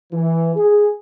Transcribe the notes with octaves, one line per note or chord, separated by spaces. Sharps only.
E3
G#4